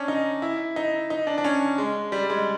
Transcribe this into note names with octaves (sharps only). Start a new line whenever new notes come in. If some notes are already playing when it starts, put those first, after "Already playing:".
Already playing: C#4 D4
D#4
E4
D#4
D#4
D4
D4
C#4
G#3
G3
G#3